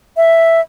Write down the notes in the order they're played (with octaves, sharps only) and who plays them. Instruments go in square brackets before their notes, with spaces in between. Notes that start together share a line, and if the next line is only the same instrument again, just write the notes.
[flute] E5